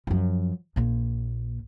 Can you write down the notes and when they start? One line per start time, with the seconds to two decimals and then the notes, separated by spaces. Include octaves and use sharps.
0.07 F#2 F3
0.76 A#1 A#2